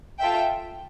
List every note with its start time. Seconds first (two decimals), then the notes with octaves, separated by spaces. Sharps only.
0.19 F4 A4 E5 G5